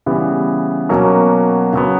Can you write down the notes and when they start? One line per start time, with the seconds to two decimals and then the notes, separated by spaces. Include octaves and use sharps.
0.06 C#3 E3 G3 B3
0.89 B2 F#3 A#3 C#4
1.73 C#3 F#3 B3